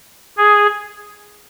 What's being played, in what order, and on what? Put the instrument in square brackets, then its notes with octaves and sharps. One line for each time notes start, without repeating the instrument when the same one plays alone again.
[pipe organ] G#4